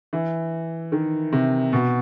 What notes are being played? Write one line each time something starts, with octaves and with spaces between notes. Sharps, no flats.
E3
D#3
C3
B2